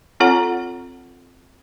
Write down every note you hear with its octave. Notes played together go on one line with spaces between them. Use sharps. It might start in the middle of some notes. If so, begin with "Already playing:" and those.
C4 F4 A4 C#5 F#5 A#5